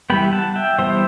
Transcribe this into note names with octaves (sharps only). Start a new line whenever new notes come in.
E3 G3 B3 G5 B5
F#5 A5
E5 G5
E3 G3 B3 C5 E5